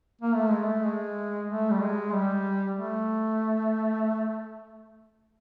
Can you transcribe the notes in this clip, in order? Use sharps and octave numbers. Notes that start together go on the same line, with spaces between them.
A#3
A3
G#3
A3
G#3
A3
G3
G#3
G3
A3